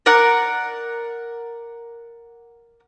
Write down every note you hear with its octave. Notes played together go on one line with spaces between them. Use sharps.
A#4 D5 F#5 A#5